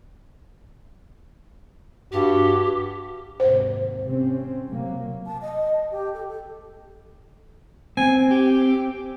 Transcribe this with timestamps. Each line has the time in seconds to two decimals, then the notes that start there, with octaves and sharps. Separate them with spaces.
2.12 G2 F#4 G4
3.40 D#2 G#2 C3 C5
4.04 C3 C4 C#4
4.67 C3 F#3 A#3
5.25 A5
5.41 D#5
5.73 A5
5.91 G4
6.13 A4
6.29 A4
7.97 C4 G#5
8.30 G4